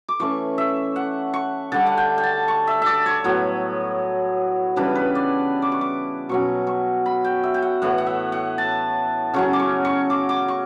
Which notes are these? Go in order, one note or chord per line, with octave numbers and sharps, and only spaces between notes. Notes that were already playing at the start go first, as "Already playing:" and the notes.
D6
E3 A3 C#4 C#6
E5
F#5
C#6
D3 G3 D4 A5
F#5
G5
G5
A5
C#6
E5
D5 E5
C#5
A2 F#3 B3
C#3 E3 G3 D4 B4
B4
D5
D6
C#6
D6
B2 F#3 C#4 C#6
C#6
B5
G5
E5
G5
F#5
A2 E3 B3 F#5
F#5
E5
F#5
A5
C#3 F#3 C#4 C#6
D6
C#6
C#6
D6
D6
C#6